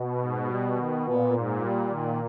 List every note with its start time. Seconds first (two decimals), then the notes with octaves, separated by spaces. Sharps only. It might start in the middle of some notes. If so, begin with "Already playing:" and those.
Already playing: B2
0.19 G#2
0.48 G3
0.76 D#3
1.05 A#2 B3
1.33 G#2
1.62 G3
1.90 D#3